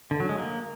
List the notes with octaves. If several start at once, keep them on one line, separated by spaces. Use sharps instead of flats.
D3
F#3
G#3
A#3